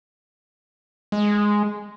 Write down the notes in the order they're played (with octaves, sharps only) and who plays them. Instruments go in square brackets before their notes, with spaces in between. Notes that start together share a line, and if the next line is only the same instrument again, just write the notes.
[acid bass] G#3